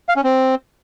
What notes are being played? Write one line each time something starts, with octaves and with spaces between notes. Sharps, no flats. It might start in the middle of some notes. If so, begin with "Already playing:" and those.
F5
C#4
C4